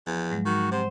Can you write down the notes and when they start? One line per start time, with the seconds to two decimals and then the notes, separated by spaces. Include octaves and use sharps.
0.07 E2 F3
0.30 G#2 F#3 G#3
0.45 D#3 F#4
0.71 C3 C5 F#5